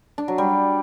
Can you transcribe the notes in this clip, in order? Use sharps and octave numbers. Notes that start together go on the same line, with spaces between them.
D4
F#3
G3